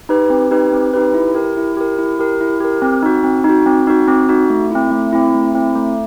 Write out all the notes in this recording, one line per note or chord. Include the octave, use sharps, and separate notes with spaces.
D#4 G4 B4
C4
D#4 G4 B4
C4
D#4 G4 B4
E4
G4 A#4
E4
G4 A#4
E4
G4 A#4
E4
G4 A#4
C4
D#4 F#4
C4
D#4
F#4
C4
D#4 F#4
C4
D#4 F#4
A3
C4 E4
A3
C4 E4
A3
C4 E4
A3